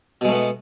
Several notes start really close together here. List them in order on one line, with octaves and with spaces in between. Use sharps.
B2 G#3 A3 B3